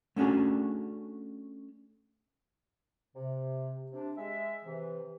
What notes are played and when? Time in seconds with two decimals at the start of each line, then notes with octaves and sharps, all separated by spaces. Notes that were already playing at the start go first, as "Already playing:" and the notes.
0.16 A3 C#4 D4 F#4 G#4
3.16 C3
3.92 C3 D4
4.17 G#3 E5
4.64 C3 E3